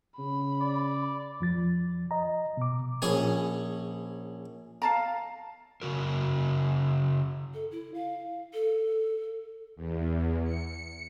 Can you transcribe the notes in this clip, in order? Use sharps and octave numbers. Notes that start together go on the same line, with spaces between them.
C#3 B5
D5
F2 F3 A6
D#5 A#5
B2 D6
A#1 C#4 G#4 G#5
F5 A5 A#5
C#3 F#4 A#4
A4
E4
F5
A4
E2
C#7